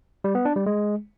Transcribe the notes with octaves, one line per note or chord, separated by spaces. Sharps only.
G3
B3
D4
G3
G#3